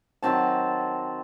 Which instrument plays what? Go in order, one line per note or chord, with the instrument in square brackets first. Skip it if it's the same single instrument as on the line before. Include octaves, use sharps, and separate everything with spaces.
[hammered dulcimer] D#3 F#3 C4 A5